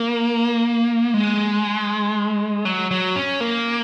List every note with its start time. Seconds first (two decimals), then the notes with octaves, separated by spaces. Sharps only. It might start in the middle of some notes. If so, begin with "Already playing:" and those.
Already playing: A#3
1.14 G#3
2.65 F#3
2.91 F#3
3.16 C#4
3.40 A#3